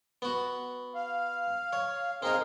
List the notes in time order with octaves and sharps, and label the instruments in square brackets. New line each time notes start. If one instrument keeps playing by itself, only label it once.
[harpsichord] B3 F#4
[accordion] F5
[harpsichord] C#5
[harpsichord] C4 D#4 [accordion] G#4 A#4 F5